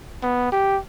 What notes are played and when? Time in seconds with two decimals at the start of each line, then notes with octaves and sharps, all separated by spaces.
0.23 B3
0.52 G4